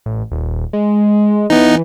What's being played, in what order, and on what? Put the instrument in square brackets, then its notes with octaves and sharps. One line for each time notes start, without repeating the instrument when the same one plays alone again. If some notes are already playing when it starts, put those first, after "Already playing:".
[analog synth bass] A1
D#1
G#3
[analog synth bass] E3 [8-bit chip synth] B3 D#4